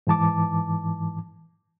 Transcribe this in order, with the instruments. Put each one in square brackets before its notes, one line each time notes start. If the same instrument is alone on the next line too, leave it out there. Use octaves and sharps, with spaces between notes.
[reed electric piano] G#2 E3 A5 D6